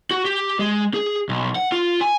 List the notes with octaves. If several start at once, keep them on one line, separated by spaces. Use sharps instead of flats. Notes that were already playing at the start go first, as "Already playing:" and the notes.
F#4
G4
G#3
G#4
B1
F#5
F4
G#5